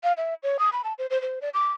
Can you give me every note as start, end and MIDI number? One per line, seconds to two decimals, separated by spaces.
0.03 0.13 77
0.17 0.34 76
0.43 0.57 73
0.59 0.69 87
0.73 0.82 83
0.84 0.93 81
0.98 1.06 72
1.10 1.20 72
1.22 1.39 72
1.42 1.49 74
1.54 1.72 86